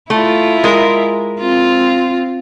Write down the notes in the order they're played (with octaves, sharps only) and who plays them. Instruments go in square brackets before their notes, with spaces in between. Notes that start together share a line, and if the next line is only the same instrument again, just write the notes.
[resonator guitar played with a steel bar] A3 [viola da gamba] E4 F4
[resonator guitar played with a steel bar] G#3 A#4
[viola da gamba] C4 F4